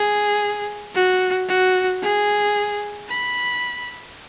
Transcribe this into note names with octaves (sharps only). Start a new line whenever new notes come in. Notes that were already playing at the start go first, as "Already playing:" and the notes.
Already playing: G#4
F#4
F#4
G#4
B5